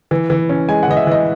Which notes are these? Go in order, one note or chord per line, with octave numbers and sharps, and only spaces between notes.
E3
E3
C#4
G#3 G#5
F#5
E3 D#5
E5
E3 D#5